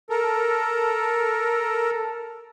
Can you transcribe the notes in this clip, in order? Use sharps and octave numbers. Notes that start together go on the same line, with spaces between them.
A4 A#4